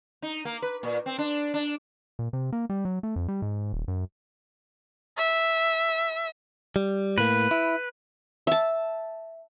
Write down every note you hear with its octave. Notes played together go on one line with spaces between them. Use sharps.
D#4
A#3
B4
A#2
C4
D4
D4
A#2
C3
A#3
G3
F#3
A3
F2
G3
G#2
D#1
F#2
E5
G3
A2 A#3 B4
E4
E5 A5